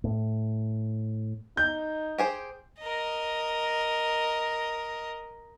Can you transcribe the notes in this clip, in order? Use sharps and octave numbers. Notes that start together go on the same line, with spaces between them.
A2
D#4 G6
G4 G#4 C5
A#4 D#5